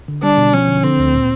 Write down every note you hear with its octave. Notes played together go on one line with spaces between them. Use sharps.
D3
G3 D4
B2
F3 C#4
D3
D3 C4
D2
A#2